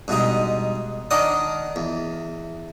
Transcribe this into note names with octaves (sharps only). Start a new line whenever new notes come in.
G2 B2 G#3 D#4
D#3 D4 A#4 D5 F#5 D#6
E2